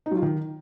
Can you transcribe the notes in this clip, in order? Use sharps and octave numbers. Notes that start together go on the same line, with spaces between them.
D#4
F#3
F4
D#3